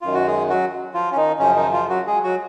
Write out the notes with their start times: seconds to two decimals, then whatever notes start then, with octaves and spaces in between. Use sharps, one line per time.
0.02 F#2 D#3 F4
0.14 F#4
0.27 G#3 G#4
0.50 F#3 F#4
0.94 F3 F4
1.12 C#4
1.16 D#3 D#4
1.39 F#2 C#3 F3 C#4
1.56 D#3 D#4
1.73 F3 F4
1.90 F#3 F#4
2.07 G#3 G#4
2.23 F#3 F#4